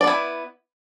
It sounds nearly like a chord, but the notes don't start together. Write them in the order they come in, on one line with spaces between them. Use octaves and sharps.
D5 B3 E4